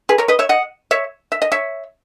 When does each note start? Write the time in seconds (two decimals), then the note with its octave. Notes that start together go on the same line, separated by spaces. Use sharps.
0.09 G#4 B4
0.18 A#4 C#5
0.28 B4 D#5
0.39 C#5 E5
0.49 D#5 F#5
0.91 C#5 E5
1.32 E5
1.42 D#5
1.52 C#5 E5